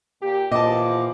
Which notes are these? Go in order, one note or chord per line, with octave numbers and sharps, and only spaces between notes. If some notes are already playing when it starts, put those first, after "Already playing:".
A#2 G4
E2 A#2 E3 F3 D#5 A5 D6